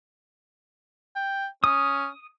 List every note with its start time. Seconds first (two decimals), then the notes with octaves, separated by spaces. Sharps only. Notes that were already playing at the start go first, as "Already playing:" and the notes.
1.16 G5
1.64 C#4 D#6